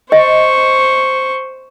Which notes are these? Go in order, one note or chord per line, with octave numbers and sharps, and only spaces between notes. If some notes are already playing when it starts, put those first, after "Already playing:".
C5 D#5 C#6